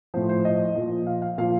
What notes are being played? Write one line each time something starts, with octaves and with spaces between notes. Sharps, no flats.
A2 F3 C5
C5
D#5
A#2 F3
F5
F5
A#2 F3 F5